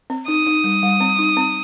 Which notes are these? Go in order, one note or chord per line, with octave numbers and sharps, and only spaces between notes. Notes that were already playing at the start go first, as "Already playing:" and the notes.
C4
D#4 D#6
D#4
G3
G3
C4
D#4
C4